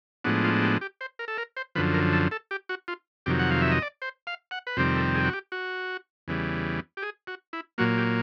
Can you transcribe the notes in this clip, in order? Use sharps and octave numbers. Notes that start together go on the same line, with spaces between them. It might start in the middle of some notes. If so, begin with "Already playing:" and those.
A2 F3 G#3 B3 D4 F#4
F4
G4
G4
C5
A#4
A4
A#4
C5
F#2 D3 F3 B4
A#4
A4
A4
G4
F#4
F4
F2 C3 D#3 F#3 G4
F#5
F5
E5
D#5
D5
C5
F5
F#5
B4
F2 C3 D#3 G3 C4 C5
A4
G#4
F#4
G4
F#4
E2 C#3 E3 G3
G4
G#4
F#4
E4
A#2 F#3 A#3 F#4
G4